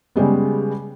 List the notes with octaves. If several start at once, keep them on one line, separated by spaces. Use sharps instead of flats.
C#3 G3 G#3 B3